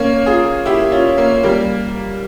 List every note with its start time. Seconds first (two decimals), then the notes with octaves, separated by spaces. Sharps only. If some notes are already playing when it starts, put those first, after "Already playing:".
Already playing: A#3 C#4
0.26 F4 G#4
0.65 E4 G4
0.92 C#4 F4
1.17 A#3 C#4
1.43 G3 A#3